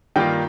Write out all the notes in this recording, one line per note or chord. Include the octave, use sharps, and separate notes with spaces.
G2 D#3 G3 A#3 F4 G5